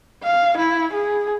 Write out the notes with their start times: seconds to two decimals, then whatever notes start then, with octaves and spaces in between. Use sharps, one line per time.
0.23 F5
0.58 E4
0.93 G#4